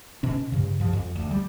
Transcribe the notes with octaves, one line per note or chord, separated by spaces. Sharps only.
B2 C#4
G2 C#3
G2 F3
F2
D2
G3